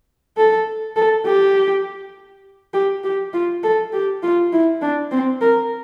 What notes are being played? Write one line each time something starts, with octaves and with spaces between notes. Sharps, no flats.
A4
A4
G4
G4
G4
F4
A4
G4
F4
E4
D4
C4
A#4